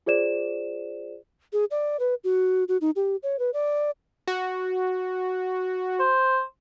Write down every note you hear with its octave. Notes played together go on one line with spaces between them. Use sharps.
F4 G#4 C5 D5 E7
G#4
D5
B4
F#4
F#4
D#4
G4
C#5
B4
D5
F#4
C5